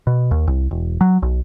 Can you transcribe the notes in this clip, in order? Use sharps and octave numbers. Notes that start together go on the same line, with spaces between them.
B2
D#2
C2
E1
F#3
B1